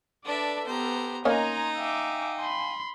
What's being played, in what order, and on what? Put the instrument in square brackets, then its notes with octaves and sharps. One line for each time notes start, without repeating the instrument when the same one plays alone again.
[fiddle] D4 E5 [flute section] A4 B4 A5 [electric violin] D5
[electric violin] B3 G4 [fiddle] C5 A#5
[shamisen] A#3 C#4 D#5 [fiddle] D#4 [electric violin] G#5 A#5 [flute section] C6
[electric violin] E5 D6 [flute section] F5 G5 G#5
[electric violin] B5 C6